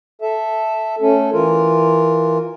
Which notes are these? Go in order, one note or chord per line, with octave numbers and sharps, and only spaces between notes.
A4 E5
A3 C#4 A4
E3 F4 A#4